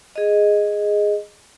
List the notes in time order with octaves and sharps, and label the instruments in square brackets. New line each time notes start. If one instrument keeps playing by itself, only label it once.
[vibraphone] G#4 D#5